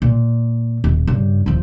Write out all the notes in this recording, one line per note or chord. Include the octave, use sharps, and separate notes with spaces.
A#2
D#1
G2 C#3
D#1 F3